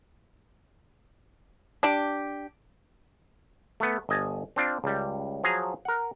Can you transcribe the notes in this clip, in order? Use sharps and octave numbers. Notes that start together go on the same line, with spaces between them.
D4 G4
A3 B3
G1 D#5 G#5 A5
C4 D4 F4
C#2 G3
F3 F#3 G#4 A#5
A#4 F#5